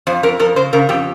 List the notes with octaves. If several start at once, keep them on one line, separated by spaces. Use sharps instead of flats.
F2 C5
F2 A#4
F2 A#4
C#3 C5
C#3 A#4
F2 G4